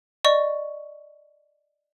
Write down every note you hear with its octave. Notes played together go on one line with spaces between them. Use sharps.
D5 D#5 C#6